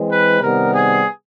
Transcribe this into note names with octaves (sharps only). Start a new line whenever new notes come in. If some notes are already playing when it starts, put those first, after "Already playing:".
Already playing: E3 G#3 C4
B4
C3 D#3 G3 B3 A#4
G#4